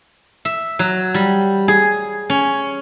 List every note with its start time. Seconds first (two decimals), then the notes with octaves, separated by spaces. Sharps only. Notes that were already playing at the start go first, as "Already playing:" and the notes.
0.45 E5
0.79 F#3
1.14 G3
1.68 G#4
2.30 C#4